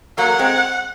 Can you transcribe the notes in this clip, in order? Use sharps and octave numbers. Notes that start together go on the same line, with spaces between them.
F#3 A#3 F#5
G#3 C4